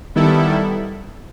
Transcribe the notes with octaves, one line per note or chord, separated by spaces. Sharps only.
D#3 G3 B3 E4 A4